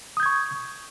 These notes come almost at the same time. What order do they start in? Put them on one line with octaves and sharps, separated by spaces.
D#6 G6 G#6 C#6